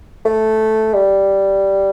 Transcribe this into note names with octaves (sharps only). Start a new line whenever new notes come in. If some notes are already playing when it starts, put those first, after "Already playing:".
A3
G3